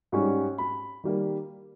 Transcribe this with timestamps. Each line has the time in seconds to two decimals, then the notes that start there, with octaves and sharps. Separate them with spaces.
0.12 G#2 G3 C#4 C#6
0.58 B5
1.04 D#3 G3 A#3